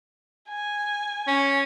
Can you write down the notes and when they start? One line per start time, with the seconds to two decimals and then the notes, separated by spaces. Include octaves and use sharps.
0.48 G#5
1.27 C#4